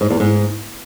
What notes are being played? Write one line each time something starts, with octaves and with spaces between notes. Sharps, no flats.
G#2
E2
G#2